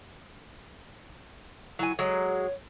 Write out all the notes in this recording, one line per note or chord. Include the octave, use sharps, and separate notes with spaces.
F#3 E4 G#5
F#3 G#3 C#5